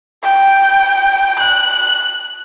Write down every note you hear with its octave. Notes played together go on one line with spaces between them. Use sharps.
G5
F#6